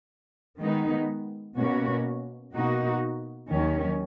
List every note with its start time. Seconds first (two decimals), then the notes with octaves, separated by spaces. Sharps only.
0.59 D#3 G#3 B3 D#4
1.56 B2 A#3 C#4 F#4
2.54 B2 A#3 D#4 F#4
3.51 D#2 D#3 F#3 C#4